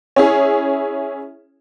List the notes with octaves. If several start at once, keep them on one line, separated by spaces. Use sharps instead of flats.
C#4 E4 G#4